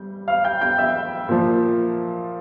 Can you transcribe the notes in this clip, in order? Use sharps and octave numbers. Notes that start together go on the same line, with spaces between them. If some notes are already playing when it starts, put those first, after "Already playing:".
Already playing: G3 G6
F5 F6
G5 G6
G5 G6
E5 E6
A#2 F3